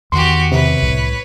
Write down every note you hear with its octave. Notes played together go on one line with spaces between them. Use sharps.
E2 D#3 F#4 G4 C6
C3 B4 C#5
C2 A2